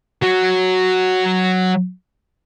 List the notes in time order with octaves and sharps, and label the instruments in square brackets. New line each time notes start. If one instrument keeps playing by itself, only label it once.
[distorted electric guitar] F#3 F#4